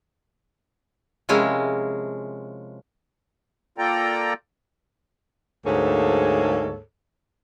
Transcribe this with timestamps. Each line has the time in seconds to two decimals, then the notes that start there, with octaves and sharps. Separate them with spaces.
1.29 C3 F3 G#3 C#4 E4 A#4
3.78 A#3 F4 A4 D5 G5 A#5
5.65 D2 G#2 A#3 G#4 A4 C#5